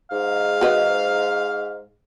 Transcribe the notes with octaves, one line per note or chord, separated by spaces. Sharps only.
G#2 F5
F#4 B4 D#5